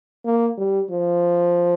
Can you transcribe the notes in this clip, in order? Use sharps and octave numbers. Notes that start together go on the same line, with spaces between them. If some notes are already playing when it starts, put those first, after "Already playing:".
A#3
G3
F3